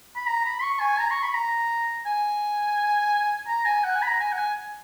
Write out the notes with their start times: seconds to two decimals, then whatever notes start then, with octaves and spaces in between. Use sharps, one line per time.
0.16 B5
0.27 A#5
0.46 B5
0.62 C#6
0.80 G#5
0.99 A#5
1.11 C#6
1.23 B5
1.34 A#5
2.06 G#5
3.47 A#5
3.65 G#5
3.84 F#5
3.96 G#5
4.02 B5
4.08 A#5
4.20 G#5
4.32 F#5
4.37 G#5